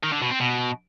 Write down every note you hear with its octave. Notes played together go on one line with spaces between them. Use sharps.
D#3
D3
B2
C4
B2